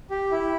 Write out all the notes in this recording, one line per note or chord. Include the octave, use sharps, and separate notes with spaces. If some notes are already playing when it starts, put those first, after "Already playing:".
G4
E4